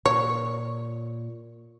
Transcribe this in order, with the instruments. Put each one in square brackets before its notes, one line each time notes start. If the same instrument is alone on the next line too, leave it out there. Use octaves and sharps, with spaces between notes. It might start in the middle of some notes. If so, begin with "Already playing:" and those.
[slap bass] A#2 [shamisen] C#5